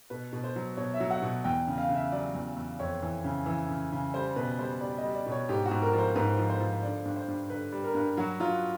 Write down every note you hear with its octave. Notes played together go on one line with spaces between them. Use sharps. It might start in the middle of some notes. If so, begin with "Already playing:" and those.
B2 B4
B2
C5
F#3
B2 C#5
E5
F#3
F#5
B2
E2 G5
C#3
F5
C#3
E5
F#3 D5
E2
E2
F2 C#5
E3
C#3
E3
C#3
C#3
G3 C5
B2 B4
G3 C5
G3 D5
G3 D#5
D5
B2
C#5
G#2 G4
F#4
G#2
A#4
F3
C5
G#2 B4
F3
C5
F3
D3 D5
G2
C5
G2
D3 B4
G3
A#4
G2
F#3 F#4
F#3 F4